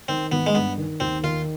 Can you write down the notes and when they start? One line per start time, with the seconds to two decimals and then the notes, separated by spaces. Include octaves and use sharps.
0.08 D#3 C4
0.32 G#1 B3
0.46 G#3
0.54 G2 B3
0.78 D#3
1.00 D#2 C4
1.23 D#3 F4